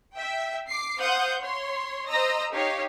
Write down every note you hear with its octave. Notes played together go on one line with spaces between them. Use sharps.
E5 G5
D6 C7
C5 F5 F#5 D#6 G6
C#5 C6
C5 D#5 A#5 E6 A#6
D#4 G4 C#5 F5